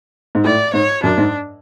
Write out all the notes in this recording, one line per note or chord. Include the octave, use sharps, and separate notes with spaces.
G#2
A2 D5
G#2 C#5
F#2 D4
G#2